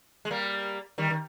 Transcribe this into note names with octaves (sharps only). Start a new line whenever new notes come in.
G#3
G3 A#3
D#3 G3
D#3